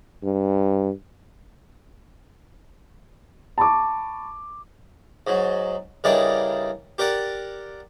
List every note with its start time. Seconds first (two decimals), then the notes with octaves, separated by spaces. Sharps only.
0.23 G2
3.58 A5 B5 C#6 D6
5.27 G#2 F#3
6.04 C#3 E3 G3 D4 D#4 A#4
6.98 G4 A#4 D5 F#5